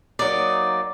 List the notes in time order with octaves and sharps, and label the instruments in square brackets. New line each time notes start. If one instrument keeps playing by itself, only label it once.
[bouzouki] F#3 A#3 D#4 [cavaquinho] D5